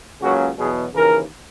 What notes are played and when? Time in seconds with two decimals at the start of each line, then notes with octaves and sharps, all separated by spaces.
0.20 C#2 C#3 F#3 A#3 F#4
0.57 E2 B2 F#3 G#4
0.92 D#2 C#3 E3 A#4